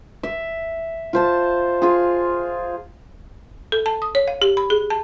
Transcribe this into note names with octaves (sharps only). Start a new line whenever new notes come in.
E5
F4 C5 A5
F4 G#4
A4
A5
D#6
C#5
F5
G4
B5
G#4
A5